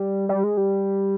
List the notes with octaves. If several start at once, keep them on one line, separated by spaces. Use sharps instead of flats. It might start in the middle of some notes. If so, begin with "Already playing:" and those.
Already playing: G3
G3
G#3
G3